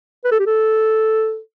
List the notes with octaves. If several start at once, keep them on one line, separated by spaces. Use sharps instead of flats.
B4
A4
G4
A4